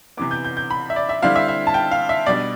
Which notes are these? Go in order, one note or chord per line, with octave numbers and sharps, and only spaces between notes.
C3 E3 B3 D6
G6
G6
G6
B5
E5
D5
E5
D3 G3 C4 E4 F5
E5
E5
A5
G5
F5
E5
B2 G3 D4 D5